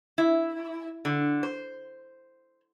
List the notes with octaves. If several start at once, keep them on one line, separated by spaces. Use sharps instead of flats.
E4
D3
C5